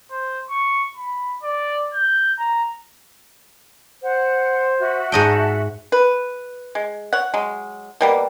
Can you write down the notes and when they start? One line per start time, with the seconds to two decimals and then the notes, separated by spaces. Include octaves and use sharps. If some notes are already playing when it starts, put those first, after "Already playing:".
0.11 C5
0.50 C#6
0.97 B5
1.43 D5
1.94 G6
2.39 A#5
4.02 C5 F#5
4.80 F#4 E5
5.12 G#2 D#5 G5 A5
5.92 B4
6.75 G#3
7.13 C#5 F#5
7.34 F#3 G#3
8.01 B2 G3 A#3